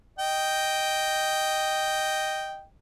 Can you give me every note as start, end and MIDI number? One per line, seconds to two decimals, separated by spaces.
0.19 2.64 75
0.19 2.64 79